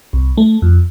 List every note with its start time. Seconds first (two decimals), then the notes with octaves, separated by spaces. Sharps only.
0.13 C2
0.37 A3
0.62 F2